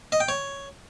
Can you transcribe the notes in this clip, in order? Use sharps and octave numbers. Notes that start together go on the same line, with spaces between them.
D#5
G5
C#5